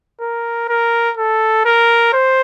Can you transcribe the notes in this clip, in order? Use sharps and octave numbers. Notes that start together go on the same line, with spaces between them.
A#4
A#4
A4
A#4
C5